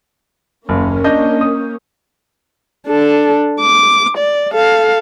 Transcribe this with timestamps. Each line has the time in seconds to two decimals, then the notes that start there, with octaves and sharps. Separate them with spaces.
0.69 F#1 D#2 A#3 C#4
1.04 D4 D#5 G6
1.41 D#6
2.88 D4 A4
3.61 D6
4.18 D5
4.52 A4 F5